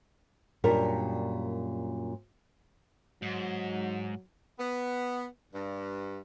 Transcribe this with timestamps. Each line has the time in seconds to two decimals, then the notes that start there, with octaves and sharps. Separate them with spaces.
0.64 F#2 A#2 G3 D4 A#4
3.22 G#2 F#3
4.59 B3
5.53 G2